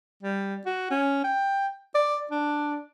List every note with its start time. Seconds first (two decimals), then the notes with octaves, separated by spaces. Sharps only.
0.23 G3
0.66 F#4
0.91 C#4
1.24 G5
1.95 D5
2.31 D4